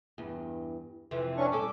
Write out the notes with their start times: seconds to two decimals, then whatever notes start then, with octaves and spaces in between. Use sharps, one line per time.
0.18 E2 G2
1.11 F2 C3 E3
1.37 C#4 D4 C#6
1.52 G3 C#4 A4 D6